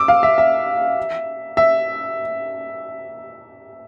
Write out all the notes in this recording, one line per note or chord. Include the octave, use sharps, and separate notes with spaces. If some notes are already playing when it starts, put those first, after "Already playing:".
Already playing: D6 E6
F5
E5
E5
E5